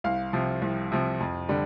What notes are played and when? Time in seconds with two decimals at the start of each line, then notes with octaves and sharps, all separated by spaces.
0.04 C2 F5
0.33 C3 F3
0.62 C2
0.92 C3 F3
1.20 F2
1.49 D3 G3